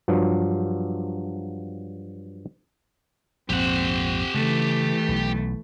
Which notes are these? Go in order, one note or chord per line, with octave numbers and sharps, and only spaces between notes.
G2 F3 F#3
A#1 F2 G#2 C4 G4 F#5
C#3 E3 A3
B1